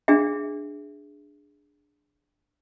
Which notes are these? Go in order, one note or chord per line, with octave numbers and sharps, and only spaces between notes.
D4 G#4 E5